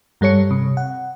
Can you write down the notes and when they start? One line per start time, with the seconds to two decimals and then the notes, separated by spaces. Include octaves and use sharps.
0.21 G2 G3 A4 C#5 C#7
0.51 C3
0.77 F#5